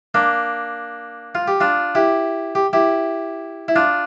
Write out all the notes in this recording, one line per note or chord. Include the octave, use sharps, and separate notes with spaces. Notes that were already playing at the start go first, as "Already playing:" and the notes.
A#3 D4
F4
G4
D4 F4
E4 G4
G4
E4 G4
E4
D4 F4